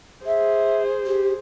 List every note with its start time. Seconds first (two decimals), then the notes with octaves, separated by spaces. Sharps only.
0.26 G#4 C5 E5
1.05 G4